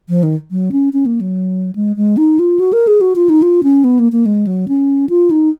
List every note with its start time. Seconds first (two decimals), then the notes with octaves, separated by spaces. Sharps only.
0.09 F3
0.23 D#3
0.51 F#3
0.72 C#4
0.93 C#4
1.06 A#3
1.21 F#3
1.75 G#3
1.96 G#3
2.17 D#4
2.39 F4
2.60 F#4
2.73 A#4
2.87 G#4
3.01 F#4
3.16 F4
3.29 D#4
3.42 F4
3.63 C#4
3.84 B3
3.99 A#3
4.12 A#3
4.26 G#3
4.47 F#3
4.68 C#4
5.09 F4
5.31 D#4